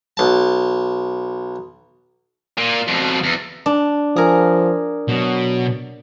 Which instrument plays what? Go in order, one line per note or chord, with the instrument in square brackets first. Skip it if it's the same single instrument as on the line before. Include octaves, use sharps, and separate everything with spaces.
[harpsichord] B1 A5
[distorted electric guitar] A#2
F2 B2
E2
[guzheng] D4
[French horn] F3 [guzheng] G#4 A#4
[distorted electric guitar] B2 [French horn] F#3